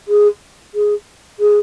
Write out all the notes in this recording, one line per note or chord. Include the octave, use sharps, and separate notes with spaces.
G#4
G#4
G#4